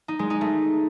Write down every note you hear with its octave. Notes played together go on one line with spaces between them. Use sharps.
D#4
G#3
D#4
A3